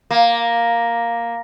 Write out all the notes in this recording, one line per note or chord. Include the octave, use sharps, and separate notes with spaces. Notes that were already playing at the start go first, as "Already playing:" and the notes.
A#3